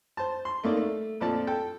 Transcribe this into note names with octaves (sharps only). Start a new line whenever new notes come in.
C5 A5
C6
A3 A#3 D#4 D5
A3
F2 A#2 F3 A4 D5 A5
A4 G5